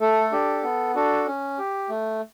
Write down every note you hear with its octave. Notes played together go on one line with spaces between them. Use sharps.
A3 A4
D4 G4
B3
D4 F#4 A4
C#4
G4
A3